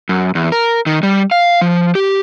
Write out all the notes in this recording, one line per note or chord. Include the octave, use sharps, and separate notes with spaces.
F#2
E2
A#4
D#3
G3
F5
F3
G4